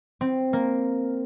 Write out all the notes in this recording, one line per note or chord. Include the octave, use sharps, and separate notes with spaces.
C4
A#3